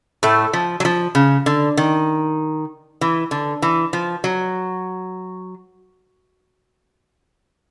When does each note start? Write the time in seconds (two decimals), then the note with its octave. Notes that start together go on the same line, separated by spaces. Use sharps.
0.23 A2 A3
0.53 F3
0.80 F#3
0.85 F3
1.15 C#3
1.46 D3
1.77 D#3
3.01 E3
3.31 D3
3.62 E3
3.93 F3
4.24 F#3